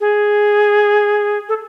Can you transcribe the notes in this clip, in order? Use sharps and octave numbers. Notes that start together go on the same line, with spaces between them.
G#4
A4